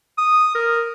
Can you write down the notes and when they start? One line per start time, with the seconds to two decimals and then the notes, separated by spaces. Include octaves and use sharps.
0.18 D#6
0.55 A#4